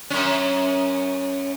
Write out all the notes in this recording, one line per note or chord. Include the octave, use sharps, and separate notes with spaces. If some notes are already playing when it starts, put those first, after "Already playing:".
F#2 C#4